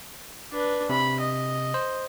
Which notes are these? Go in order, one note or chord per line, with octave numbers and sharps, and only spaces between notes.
D4 B4
C3 B5
D#5
C5